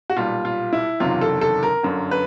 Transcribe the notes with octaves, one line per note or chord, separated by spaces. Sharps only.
F#4
B1 A#2 G3 F4
F4
E4
F#1 E2 C3 D#3 F#3 F4
A4
A4
A#4
G1 F#2 D3 F#3
B4